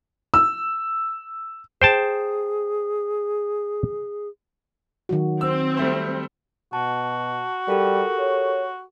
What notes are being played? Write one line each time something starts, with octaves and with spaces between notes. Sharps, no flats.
E6
G#4 C5 G5 A5
D#3 F#3 F#4
C4 E6
G3 A3 C5
B2 F#4 A5
G3 G4 A4 A#4
C#5